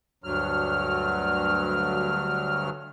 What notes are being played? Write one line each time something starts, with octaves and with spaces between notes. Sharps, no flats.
D2 G2 F#3 F6